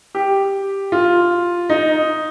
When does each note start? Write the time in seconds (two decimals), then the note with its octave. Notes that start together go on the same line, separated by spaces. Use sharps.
0.15 G4
0.92 F4
1.69 D#4